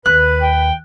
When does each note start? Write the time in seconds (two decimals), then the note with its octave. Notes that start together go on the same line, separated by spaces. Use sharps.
0.06 D#2 B4 F#6
0.42 G5